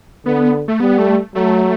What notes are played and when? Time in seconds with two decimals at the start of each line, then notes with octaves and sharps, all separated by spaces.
0.26 D3 B3
0.68 A3
0.80 G3 B3
0.98 A3
1.35 F#3 A3